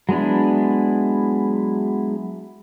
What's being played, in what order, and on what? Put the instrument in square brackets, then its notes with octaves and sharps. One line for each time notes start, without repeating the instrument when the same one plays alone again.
[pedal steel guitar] F#3 G#3 B3 D4 E4